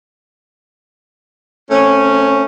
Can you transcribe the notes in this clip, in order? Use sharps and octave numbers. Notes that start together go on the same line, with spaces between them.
A3 C4 C#4